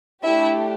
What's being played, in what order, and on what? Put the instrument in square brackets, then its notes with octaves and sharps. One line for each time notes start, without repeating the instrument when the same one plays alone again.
[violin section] A3 D4 E4 G4 E5